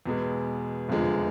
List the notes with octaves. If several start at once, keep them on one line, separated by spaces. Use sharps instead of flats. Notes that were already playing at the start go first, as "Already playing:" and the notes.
E2 B2 G#3
F1 E2 D3 F3 G#3